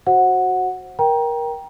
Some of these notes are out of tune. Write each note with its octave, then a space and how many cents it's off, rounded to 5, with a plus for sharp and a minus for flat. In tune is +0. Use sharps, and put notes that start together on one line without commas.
F#4 +0 C5 +20 F#5 -10
A#4 +20 G5 +0 A#5 +25